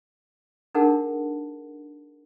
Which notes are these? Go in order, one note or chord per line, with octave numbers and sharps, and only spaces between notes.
D4 D#4 G#4 A#4 F#5 A5